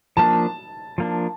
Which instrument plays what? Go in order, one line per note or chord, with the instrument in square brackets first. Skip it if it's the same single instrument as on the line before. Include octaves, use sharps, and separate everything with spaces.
[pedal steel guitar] F3 A#3 D4 [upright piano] A5
[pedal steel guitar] F3 A#3 D4